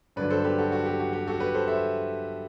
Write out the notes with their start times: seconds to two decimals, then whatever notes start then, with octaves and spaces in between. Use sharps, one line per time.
0.16 G2 D3 F#3 B4 D5
0.30 A4 C5
0.44 G4 B4
0.59 F#4 A4
0.72 F#4
0.86 G4
1.00 F#4
1.13 G4
1.27 F#4 A4
1.40 G4 B4
1.54 A4 C5
1.68 C5 E5